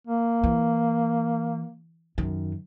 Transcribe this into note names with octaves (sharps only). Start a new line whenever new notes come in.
A#3
E3
F#2 D#3